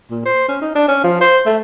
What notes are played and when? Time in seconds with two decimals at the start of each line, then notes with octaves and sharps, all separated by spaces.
0.11 A#2
0.26 C5
0.49 C#4
0.62 D#4
0.75 D4
0.88 C#4
1.04 F3
1.21 C5
1.46 A3